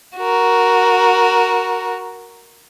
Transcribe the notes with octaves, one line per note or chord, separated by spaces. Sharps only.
F#4 A#4